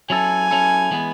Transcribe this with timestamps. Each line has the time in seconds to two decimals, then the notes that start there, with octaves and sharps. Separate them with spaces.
0.10 F#3 C#4 E4 A4 G#5
0.51 F#3 C#4 E4 A4
0.91 E3 G#3 B3